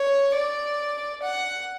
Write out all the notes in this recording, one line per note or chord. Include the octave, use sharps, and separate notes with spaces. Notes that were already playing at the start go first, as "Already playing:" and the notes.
Already playing: C#5
D5
F#5